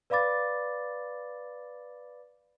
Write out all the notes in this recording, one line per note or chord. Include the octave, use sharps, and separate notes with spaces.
B4 D5 F5 B5 D6 A6